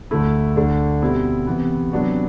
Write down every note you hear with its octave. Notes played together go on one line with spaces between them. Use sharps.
D2 D3 A3 E4
D2 D3 A3 D4
B2 G3 C4 E4
C3 E3 B3
C3 F#3 B3 D4 F#4